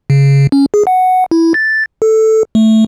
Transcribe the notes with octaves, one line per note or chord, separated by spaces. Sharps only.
C#3
C#4
G#4
F#5
E4
A6
A4
A3